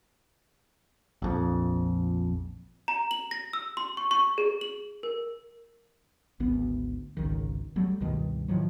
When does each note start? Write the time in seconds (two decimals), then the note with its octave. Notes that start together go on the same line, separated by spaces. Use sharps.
1.22 A#1 F2
2.88 A#5
3.11 F#7
3.31 A#6
3.53 E6
3.77 C6
3.97 C#6
4.11 C#6
4.38 G#4
4.61 F#7
5.03 A#4
6.40 G#1 D2 B3
7.17 G#1 C#2 D#3
7.76 F#3 G3 A3
8.00 C#2 G2 B2 D#3
8.48 A2 D#3 F3 F#3